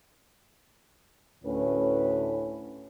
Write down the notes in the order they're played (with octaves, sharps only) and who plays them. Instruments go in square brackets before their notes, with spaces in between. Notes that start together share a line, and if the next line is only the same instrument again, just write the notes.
[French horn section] D2 A2 C#4 B4